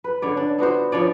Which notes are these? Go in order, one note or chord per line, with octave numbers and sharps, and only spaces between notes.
B4
D3 C#5 D5
D4
B3 D4 F#4 C5
F3 D4 C#5 D5